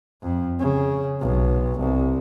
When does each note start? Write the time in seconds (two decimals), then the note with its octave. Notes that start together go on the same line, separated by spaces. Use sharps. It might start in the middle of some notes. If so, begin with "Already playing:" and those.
0.23 F2
0.59 C#3
1.21 B1
1.80 C2